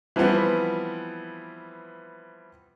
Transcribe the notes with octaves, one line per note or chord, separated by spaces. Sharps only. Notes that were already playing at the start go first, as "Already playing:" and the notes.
E3 F3 G3 B3 C4